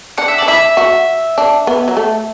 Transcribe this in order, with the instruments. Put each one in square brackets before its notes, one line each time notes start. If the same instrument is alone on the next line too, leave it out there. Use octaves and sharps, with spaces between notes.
[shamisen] D4 [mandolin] F#5
[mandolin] E5
[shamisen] D4 [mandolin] D5
[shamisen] E4 [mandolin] E5
[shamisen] F#4
D4
B3
F#3
A3